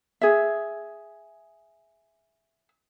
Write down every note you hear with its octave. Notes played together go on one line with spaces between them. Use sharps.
G#4 E5